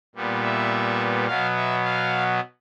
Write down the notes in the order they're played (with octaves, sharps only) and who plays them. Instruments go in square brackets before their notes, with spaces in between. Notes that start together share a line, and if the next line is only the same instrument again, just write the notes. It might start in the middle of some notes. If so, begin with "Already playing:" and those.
[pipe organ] A#2 G3 B3
E5
B2 F#3 B3 F5
E5
F5